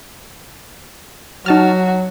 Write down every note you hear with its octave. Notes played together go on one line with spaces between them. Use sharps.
F#3 D#4 F#4 A5 F6